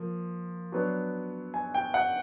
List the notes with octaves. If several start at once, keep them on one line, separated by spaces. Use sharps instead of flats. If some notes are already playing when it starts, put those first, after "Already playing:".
Already playing: F3 A#3
F#3 B3 D4
G#5
G5
F#5